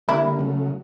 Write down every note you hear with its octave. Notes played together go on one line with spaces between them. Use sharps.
D3 G3 A#3 E4
C#3 F#3 A3